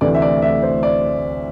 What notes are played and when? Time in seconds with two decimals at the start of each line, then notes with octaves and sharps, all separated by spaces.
0.01 D2 C3 E3 A3 D5
0.14 E5
0.22 D5
0.42 E5
0.63 C5
0.83 D5